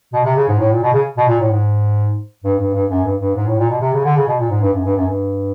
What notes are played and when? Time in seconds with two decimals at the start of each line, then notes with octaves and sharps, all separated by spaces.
0.13 B2
0.25 C3
0.36 C#3
0.48 G#2
0.59 A2
0.71 A#2
0.82 B2
0.94 C#3
1.17 B2
1.28 A#2
1.40 A2
1.51 G#2
2.44 G2
2.59 G2
2.74 G2
2.90 F#2
3.04 G2
3.21 G2
3.35 G#2
3.47 A2
3.59 A#2
3.70 B2
3.81 C3
3.93 C#3
4.04 D3
4.16 C#3
4.27 B2
4.39 A#2
4.50 G#2
4.62 G2
4.74 F#2
4.85 G2
4.97 F#2
5.07 G2